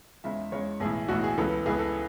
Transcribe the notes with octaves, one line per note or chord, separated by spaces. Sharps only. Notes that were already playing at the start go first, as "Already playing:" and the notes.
E2 C#3 G#3 E5
E2 C#3 G#3 C#5
B1 A2 E3 G#4
B1 A2 E3 F#4
G#4
C#2 C#3 E3 B3 A4
C#2 C#3 E3 B3 G#4
A4